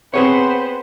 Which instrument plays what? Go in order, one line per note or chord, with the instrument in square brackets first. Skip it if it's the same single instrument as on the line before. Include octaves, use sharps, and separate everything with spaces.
[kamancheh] B3 C5 [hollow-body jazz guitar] C4 G#4 C#5